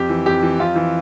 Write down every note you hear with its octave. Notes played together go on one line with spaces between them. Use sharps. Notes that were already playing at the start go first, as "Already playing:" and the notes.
Already playing: F2 G4
E3
F2 G4
E3
F2 F4
E3